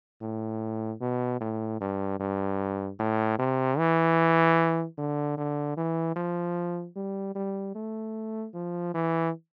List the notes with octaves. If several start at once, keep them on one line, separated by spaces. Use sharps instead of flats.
A2
B2
A2
G2
G2
A2
C3
E3
D3
D3
E3
F3
G3
G3
A3
F3
E3